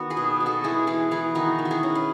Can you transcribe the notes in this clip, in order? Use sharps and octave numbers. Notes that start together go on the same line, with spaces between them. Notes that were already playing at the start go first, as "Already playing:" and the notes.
Already playing: D#3 B3 F#4
G#4 B4
B2
B2
F#4 A4
G#3 E4 G#4
E3 G#4 B4
E3 G#4 B4
D#3 D#4 F#4
D#3
F#4
E4 G#4
C#4
B4